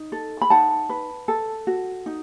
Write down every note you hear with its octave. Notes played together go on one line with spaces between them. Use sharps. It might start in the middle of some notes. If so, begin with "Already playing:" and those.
Already playing: D#4
A4
B5
D#4 F#5 A5
B4
A4
F#4
D#4